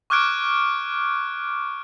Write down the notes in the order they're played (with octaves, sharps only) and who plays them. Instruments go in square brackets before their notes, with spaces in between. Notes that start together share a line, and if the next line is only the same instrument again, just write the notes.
[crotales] C#6 D6 F6 F#6 G#6 D7